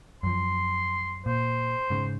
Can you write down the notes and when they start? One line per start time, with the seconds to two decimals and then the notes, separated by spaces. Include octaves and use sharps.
0.23 F#2 F3 C6
1.26 A#2 C5
1.90 G#2 C#3